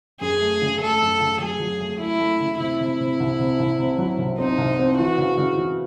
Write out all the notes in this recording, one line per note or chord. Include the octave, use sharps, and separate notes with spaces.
F#2 G#4
A3
C#3
A3 A4
F#2
C#3
F#3 G#4
F#3
A3
A3 E4
A3
C#3
C3 E4
C3
C3
C2
C3
C2
C3
F#3
C2
C4 D#4
C2
C4
E3 F#4
C#3
C#3
E3